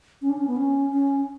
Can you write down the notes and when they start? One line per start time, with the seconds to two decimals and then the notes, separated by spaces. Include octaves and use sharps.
0.22 C#4
0.30 D4
0.38 C#4
0.47 B3
0.56 C#4
0.90 C#4